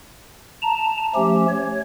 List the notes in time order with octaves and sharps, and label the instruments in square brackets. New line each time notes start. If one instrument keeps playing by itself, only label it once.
[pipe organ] A5 A#5
F3 A3 C#4 G4
C#5